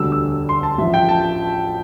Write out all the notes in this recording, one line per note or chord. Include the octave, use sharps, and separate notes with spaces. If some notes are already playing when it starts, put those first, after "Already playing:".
Already playing: E1 D2 D3 G3 E6
E6
C6
A5
A1 A2 F3 E5
G5
A5